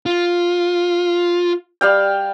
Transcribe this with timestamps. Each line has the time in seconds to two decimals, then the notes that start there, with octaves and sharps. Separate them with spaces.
0.06 F4
1.81 G3 F5 G5